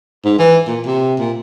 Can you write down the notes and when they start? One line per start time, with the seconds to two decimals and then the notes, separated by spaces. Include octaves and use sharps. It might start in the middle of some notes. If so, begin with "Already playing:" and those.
0.25 G#2
0.39 E3
0.67 A#2
0.86 C3
1.19 A#2